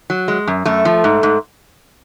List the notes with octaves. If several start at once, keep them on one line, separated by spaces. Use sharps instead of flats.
F#3
G#3
F#2
F#2 A3
F3
G#2
G#2